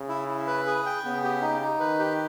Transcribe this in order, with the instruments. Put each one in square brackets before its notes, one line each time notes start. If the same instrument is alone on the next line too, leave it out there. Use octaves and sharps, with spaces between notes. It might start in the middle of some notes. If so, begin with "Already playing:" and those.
Already playing: [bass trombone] C#3
[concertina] E4
E4
B4
G#4
G5
[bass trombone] C#3 [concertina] B3
[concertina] G4
D#4
D#4
[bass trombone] D#3 [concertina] B4
[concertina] G4